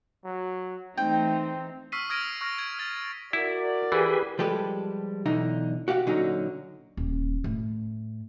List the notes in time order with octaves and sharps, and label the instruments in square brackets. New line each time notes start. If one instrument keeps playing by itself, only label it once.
[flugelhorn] F#3
[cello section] E3 A3 D#4 [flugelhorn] C4 [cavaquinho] G5
[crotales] C#6 E6 F6 B6 C7 D#7
D#6 F6 G#6 A#6 D7 D#7
C#6 F6 A#6
G#6
F6 A6
[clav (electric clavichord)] E4 [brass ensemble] F#4 A#4 D5
[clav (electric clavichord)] E3 [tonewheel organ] G4 G#4 B4
[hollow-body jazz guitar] F3 G3 G#3 G4 A4 B4
B1 D3 E3 D#4
F#4 G4 F5 F#5
A#2 D3 F#3 C#4 D#4 F#4
[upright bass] D#1
A2